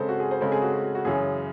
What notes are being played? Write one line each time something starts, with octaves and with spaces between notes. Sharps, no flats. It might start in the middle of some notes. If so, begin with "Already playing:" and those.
Already playing: C#3 G#3 C4 A4 C5
F#4
G#4
C5
C#3 G#3 C4 A4
G#4
F#4
F#4
F#4
F#2 C#3 E3 G#4